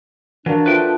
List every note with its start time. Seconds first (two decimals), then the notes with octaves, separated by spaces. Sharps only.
0.46 E3 D4 F#4 A#4 F5
0.66 F3 A3 B4 G5